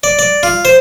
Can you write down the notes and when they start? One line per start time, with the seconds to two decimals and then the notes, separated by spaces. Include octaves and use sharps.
0.03 D5
0.19 D5
0.43 F4
0.65 C5